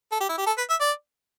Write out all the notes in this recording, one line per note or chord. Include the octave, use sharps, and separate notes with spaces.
A4
G4
E4
G4
A4
B4
E5
D5